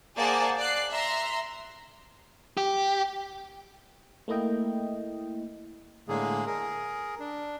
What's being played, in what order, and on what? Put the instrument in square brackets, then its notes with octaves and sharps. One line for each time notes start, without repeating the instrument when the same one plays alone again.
[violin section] A#3 G#4 C5 D5 F#5 A5
D5 F#6 C7
E5 A#5 C6
[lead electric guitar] G4
[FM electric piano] A3 A#3 E4 D#5 G5
[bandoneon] A2 D3 G#3 A#3 G#4
G#4 A#4
D4